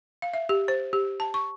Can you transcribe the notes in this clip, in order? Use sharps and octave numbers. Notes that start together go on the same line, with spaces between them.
F5
E5
G4
C5
G4
A5
C#6